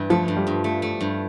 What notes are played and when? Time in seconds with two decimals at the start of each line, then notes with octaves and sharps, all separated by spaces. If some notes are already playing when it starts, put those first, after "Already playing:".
Already playing: G2 E3
0.10 F3 A3
0.28 G2
0.37 G3
0.47 G2
0.64 A3
0.82 A3
1.01 G2